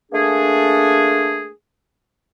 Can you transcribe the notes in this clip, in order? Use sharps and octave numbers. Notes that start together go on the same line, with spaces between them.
A3 A#3 D4 G#4